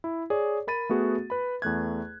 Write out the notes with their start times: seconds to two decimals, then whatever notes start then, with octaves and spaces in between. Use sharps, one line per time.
0.04 E4
0.30 G#4 C#5 D5
0.67 A#4 B5 A6 D#7
0.89 A3 B3 F#4 G#4
1.30 B4 B5
1.62 E2 A3 F#6 G#6